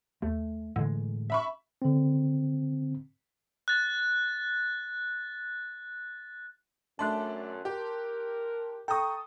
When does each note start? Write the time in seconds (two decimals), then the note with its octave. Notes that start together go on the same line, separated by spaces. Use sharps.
0.22 D#2 A3
0.76 A2 D3 E3 G#3
1.30 E5 B5 C#6
1.82 D3 C4
3.68 F#6 A6
6.99 F#2 A3 D4 A5 C6 F#6
7.65 G4 A#4
8.88 A4 G5 A#5 C#6 D#6